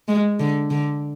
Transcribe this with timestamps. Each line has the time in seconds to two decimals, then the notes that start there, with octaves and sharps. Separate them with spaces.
0.08 G#3
0.40 D3
0.71 D3